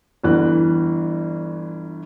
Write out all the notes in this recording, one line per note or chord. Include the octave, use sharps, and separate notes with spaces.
G1 E3 F#6